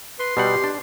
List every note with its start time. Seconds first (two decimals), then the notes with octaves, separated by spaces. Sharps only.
0.19 B4 C6
0.37 B2 G3 G4 F#5
0.64 D4